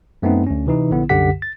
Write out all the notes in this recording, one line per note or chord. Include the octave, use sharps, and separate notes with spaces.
F#2 A3 B3 C4 D#4
D2 C#4
C3 E3 D#4
A#1 D3 B3 E4
C2 F#2 D3 G4 F#5 B6
A6